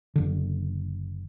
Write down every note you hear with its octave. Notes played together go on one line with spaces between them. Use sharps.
F#1 D3